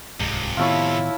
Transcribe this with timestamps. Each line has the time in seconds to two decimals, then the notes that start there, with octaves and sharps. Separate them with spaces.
0.20 D1 C2 F2 G#2 C3
0.57 A2 D#3 B3 E4 F4 A4 C#5